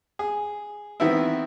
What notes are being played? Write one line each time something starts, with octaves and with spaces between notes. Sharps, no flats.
G#4
D#3 E3 B3 C4 E4